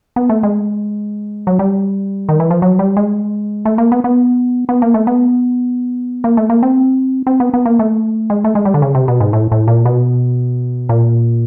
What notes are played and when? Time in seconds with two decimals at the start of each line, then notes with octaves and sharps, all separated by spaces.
0.16 B3
0.29 A3
0.43 G#3
1.47 F#3
1.59 G3
2.29 D#3
2.40 E3
2.50 F3
2.62 F#3
2.79 G3
2.97 G#3
3.65 A3
3.78 A#3
3.92 B3
4.04 B3
4.69 B3
4.82 A#3
4.94 A3
5.07 B3
6.24 A#3
6.37 A3
6.50 A#3
6.63 C4
7.27 C4
7.40 B3
7.54 B3
7.65 A#3
7.79 A3
8.30 G#3
8.44 A3
8.55 G#3
8.65 G3
8.74 D3
8.82 C#3
8.95 C3
9.08 B2
9.20 G#2
9.33 A2
9.52 A2
9.68 A#2
9.85 B2
10.89 A#2